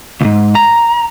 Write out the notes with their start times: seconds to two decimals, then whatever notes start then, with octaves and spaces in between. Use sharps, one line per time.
0.21 C#2 G#2
0.55 A#5